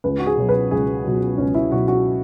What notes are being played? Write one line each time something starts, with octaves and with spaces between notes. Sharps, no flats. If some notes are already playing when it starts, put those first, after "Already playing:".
C#2 B4
F#4
G#4
B2 F#3
B4
C#2 G#4
B2 F#3
C#2 C#4
E4
B2 F#3 F#4
F#4